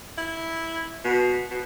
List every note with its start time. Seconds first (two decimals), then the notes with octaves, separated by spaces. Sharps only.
0.18 E4
1.04 B2
1.51 B2